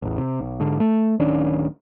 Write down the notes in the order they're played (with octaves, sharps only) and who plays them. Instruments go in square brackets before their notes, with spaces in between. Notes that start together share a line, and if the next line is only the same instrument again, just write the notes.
[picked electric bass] A1 E2
C3
B1
G#2 D3
A3
D1 D#3 C#4 D4